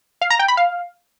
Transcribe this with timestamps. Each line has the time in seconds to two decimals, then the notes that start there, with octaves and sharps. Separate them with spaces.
0.21 F5
0.30 A#5
0.39 G5
0.48 B5
0.57 F5